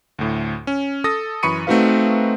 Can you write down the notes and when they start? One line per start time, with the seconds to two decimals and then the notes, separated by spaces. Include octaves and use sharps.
0.19 D2 A2
0.67 C#4
1.04 A4 D#6 A6 A#6
1.43 F#2 E3 B5 C#6 C#7 D#7
1.67 A3 C4 D#4 F#4 B4 F5